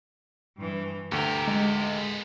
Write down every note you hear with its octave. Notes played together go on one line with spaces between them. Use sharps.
G2 E3
D2 B3 G4 A#4 A#5
G#3